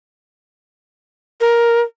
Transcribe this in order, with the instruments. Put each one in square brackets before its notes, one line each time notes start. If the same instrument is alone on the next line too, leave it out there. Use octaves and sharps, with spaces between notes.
[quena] A#4